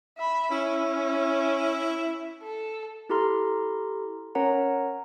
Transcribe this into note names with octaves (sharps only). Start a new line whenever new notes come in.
E5 B5
C#4 E4
A4
E4 G4 A4 A#5 C6 F6
C#4 A#4 C#5 F#5 A#5